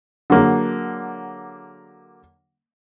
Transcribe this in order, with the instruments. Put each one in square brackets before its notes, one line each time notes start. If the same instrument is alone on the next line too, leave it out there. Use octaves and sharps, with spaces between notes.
[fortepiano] D3 F#3 A#3 G#4